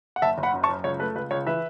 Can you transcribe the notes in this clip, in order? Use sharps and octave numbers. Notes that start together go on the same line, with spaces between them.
F#5
F#1 E5 A5
F#1
F#5 B5
F#2
A5 C#6
F#2
C#2 C#5
A3 B4
C#2 B4
C#2 C#5
E3 B4 E5